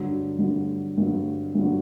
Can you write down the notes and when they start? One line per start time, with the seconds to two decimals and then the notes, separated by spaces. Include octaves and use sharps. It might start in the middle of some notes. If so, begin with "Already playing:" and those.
Already playing: G2 D3 F#3
0.39 G2 D3 F#3
0.98 G2 D3 F#3
1.55 G2 D3 F#3